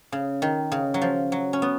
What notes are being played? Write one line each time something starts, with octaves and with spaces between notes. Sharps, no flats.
C#3
D#3
C#3
F#3
F3
F#3
C#4
B3